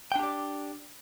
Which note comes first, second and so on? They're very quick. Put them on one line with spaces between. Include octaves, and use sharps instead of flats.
G5 D4 G4 D5